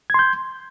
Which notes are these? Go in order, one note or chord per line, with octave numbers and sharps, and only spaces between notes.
C6 G6 G#6